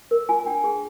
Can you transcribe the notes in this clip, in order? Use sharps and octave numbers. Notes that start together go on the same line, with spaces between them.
A#4
F4 G#5
D4 G5
G#4